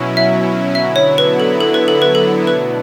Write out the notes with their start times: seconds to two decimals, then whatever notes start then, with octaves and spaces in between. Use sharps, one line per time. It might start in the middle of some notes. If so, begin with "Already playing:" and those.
Already playing: B2 F#3 C#4 E4
0.17 E5
0.75 D3 F#3 B3 E4 E5
0.96 C#5
1.18 B4
1.40 A4
1.61 A4
1.74 B4
1.88 A4
2.02 B4
2.15 A4
2.47 B2 A3 D4 B4